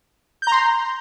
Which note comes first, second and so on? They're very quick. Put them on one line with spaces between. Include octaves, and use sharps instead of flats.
G6 A#5 C6